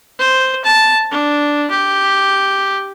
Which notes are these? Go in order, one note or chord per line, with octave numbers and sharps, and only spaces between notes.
C5
A5
D4
G4